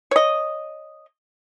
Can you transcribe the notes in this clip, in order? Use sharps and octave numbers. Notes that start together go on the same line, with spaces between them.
C#5 D#5